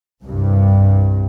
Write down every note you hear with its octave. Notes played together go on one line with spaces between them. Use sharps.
C2 G2